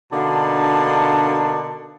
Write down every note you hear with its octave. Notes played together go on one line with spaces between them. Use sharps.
B2 D3 A#3 D4 D#4 A5